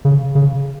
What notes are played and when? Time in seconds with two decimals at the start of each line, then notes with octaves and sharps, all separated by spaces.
0.05 C#3
0.35 C#3